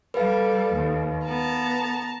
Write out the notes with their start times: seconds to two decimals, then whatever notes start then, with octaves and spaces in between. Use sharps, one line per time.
0.14 G3 A4 B4 F5
0.73 D#2
1.27 B3 A5 A#5